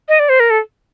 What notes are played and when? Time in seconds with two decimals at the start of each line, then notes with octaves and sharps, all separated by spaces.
0.09 D#5
0.19 D5
0.29 C5
0.40 A#4
0.50 A4